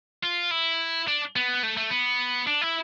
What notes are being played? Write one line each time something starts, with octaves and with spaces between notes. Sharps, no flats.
F4
E4
D4
B3
A3
A3
B3
D4
E4